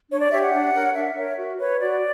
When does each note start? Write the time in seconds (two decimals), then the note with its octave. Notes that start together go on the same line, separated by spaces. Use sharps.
0.10 D4 C#5
0.21 D5
0.31 G4 C#5 E5
0.42 F#5
0.52 D4
0.74 A#4 C#5
0.95 D4 E5
1.16 A#4 C#5
1.37 F#4
1.58 B4 C#5
1.79 F#4 D5